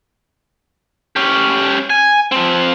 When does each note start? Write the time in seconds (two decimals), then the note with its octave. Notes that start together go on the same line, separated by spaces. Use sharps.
1.16 C#4 G4
1.90 G#5
2.32 F3 C4